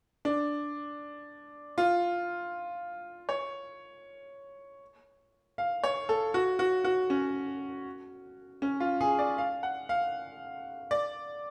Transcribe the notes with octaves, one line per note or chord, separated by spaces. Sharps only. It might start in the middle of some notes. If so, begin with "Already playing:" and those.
D4
F4
C#5
F5
C#5
A4
F#4
F#4
F#4
C#4
C#4
F4
G#4
D5
F5
F#5
F5
D5